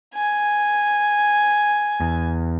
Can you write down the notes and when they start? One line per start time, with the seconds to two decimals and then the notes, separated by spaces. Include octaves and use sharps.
0.15 G#5
2.01 E2